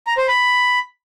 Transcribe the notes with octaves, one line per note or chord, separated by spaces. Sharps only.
A#5
C5
B5